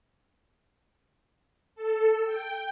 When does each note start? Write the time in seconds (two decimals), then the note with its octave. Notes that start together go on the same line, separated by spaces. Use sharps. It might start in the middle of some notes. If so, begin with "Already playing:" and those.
1.75 A4
2.25 G5